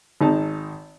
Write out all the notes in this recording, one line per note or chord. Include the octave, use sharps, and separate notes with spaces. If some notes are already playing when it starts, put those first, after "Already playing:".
G#1 D#4 A5